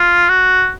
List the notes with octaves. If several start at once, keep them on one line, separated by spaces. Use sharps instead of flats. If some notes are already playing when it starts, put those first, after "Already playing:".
Already playing: F4
F#4